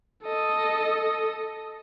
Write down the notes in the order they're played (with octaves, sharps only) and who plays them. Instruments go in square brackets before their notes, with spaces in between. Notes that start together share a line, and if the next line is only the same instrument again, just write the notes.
[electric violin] A4 D#5